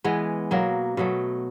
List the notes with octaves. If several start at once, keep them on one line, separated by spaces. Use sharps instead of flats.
E3 G#3 B3
B2 F#3 A#3
B2 F#3 A3